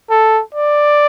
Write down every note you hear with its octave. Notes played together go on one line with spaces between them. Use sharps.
A4
D5